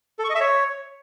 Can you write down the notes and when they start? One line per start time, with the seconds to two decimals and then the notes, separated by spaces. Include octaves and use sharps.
0.19 A4
0.24 C#6
0.30 D#5
0.35 E5
0.40 C#5